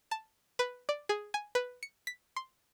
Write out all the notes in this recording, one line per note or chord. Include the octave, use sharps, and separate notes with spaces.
A5
B4
D5
G#4
G#5
B4
C#7
B6
C6